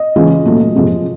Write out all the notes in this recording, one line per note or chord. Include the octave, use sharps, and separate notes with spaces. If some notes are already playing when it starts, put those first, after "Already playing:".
Already playing: D#5
C#3 E3 G#3 C#4 F4
A#2 F#3 A3
F2 C3 F3 G#3